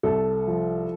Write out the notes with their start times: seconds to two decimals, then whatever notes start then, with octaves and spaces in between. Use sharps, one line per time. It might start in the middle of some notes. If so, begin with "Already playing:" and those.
0.03 C2 A4
0.47 F3